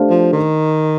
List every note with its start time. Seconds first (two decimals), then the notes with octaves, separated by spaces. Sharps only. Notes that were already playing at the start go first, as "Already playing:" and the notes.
Already playing: A3 D4 G4 C5 F5
0.10 F3
0.33 D#3